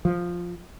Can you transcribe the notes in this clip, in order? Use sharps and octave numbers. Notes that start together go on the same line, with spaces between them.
F3